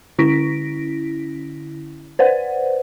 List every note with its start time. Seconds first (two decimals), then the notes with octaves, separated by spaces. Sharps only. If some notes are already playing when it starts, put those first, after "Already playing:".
0.19 D3 C#4 E4 A#6 B6 D7
2.19 B4 C5 D5 F#5